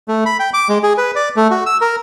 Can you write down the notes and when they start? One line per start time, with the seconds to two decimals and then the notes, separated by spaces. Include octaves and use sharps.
0.08 A3
0.25 B5
0.39 G5
0.54 D6
0.69 G#3
0.83 G#4
0.98 B4
1.16 D5
1.36 A3
1.51 F#4
1.66 E6
1.81 A#4